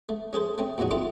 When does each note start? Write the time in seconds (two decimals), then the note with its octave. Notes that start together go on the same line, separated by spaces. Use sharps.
0.09 A3
0.33 C#4 G#4 A4 C5
0.58 A3 C4 C#4
0.78 E2 A#2 F3 F#3 D#4 F#4
0.91 C4 D4 E4 F4 A4 A#4